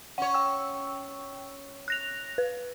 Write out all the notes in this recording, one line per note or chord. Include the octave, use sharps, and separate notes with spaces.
C#4 C#5 F#5
G5 E6
F#6 A#6 F7
B4